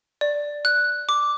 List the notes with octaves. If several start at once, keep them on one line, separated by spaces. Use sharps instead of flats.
D5
F#6
D6